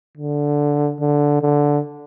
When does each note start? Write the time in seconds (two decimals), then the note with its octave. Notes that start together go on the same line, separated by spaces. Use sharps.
0.18 D3
1.00 D3
1.42 D3